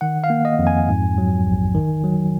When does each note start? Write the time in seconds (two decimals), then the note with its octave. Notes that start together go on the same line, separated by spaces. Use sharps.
0.01 D#3 F#5
0.24 F5
0.30 A#3
0.45 D#5
0.59 F2
0.67 G#5
0.88 G#2
1.18 F#3
1.47 A#1
1.75 D#3
2.04 F#3